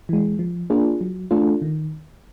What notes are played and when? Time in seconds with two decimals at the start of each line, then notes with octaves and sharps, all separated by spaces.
0.09 E3 G#3
0.39 F3
0.70 A#3 D4 F4 G#4
1.01 F#3
1.31 A3 D4 F4
1.62 D#3